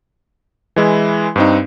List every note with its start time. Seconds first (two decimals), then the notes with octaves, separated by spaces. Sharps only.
0.76 E3 G#3 E4
1.36 G2 C4 D#4